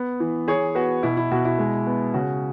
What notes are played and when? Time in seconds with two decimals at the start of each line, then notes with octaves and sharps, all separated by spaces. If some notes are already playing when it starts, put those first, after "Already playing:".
Already playing: B3
0.20 E3
0.48 E3 G#4 C#5
0.75 B3 F#4 B4
1.03 B2 E4
1.17 E4
1.31 B2 F#4
1.45 E4
1.59 G#3
1.86 B3
2.14 C#3 F#4